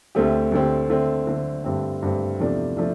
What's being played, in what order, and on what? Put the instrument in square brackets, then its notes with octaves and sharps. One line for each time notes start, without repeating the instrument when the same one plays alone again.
[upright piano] D2 D3 A3 C4 G4
D2 D3 A3 C4 G4
D3 A3 C4
D3 A3 C4
G2 D3 A3 C4
G2 D3 A3 C4
E2 C3 F3 A3 D4
F3 A3 D4